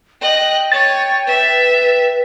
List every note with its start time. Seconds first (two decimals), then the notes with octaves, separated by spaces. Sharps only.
0.22 D#5 G5 F#6
0.72 C#5 A6 D#7
1.27 B4 E5